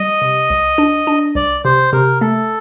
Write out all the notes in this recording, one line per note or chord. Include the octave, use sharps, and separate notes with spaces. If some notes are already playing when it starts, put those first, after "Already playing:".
Already playing: G3 D#5
C3
C2
D4
D4
C2 D5
C3 C5
C3 A#4
A3 A4